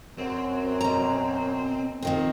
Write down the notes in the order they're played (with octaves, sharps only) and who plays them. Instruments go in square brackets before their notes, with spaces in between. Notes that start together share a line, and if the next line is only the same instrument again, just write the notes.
[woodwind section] F#2 [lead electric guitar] C4
[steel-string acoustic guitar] B2 A#5
A#2 D#3 C4